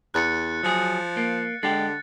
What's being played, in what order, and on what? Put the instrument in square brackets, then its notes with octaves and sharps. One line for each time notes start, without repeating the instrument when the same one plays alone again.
[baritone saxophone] E2 [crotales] F#6 A6 C#7
[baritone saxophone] F3 [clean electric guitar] F#3 G#4
[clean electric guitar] A#3
[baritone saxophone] D3 [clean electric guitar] G#3 G4 [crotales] A6